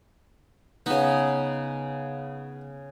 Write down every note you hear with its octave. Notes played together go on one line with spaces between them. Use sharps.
C#3 B3 D#4